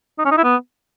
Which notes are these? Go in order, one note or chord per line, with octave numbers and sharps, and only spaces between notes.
D#4
C#4
D#4
E4
B3